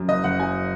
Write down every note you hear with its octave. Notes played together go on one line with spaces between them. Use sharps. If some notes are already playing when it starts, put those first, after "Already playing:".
Already playing: F#2
F#1 D#5
F#1 F#5
F#3 G#5